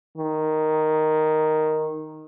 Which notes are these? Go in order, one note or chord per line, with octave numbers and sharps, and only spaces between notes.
D#3